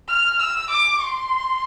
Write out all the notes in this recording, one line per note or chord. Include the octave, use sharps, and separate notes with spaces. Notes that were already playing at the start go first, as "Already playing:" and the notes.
F6
E6
D6
C6